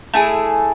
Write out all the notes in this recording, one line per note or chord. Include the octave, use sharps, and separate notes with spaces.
A3 E4 G#4